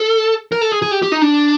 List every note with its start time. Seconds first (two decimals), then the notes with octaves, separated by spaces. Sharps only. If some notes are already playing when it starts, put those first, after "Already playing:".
Already playing: A4
0.52 A#4
0.61 A4
0.72 G#4
0.82 G#4
0.91 G4
1.02 G4
1.12 D#4
1.21 D4